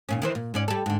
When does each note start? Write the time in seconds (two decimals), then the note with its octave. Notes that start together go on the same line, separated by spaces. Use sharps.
0.09 D#2 A#2 C#4
0.22 D#3 E3 C5
0.35 A#2
0.54 G#2 C#4 D5
0.68 G3 A4
0.86 G#2 D3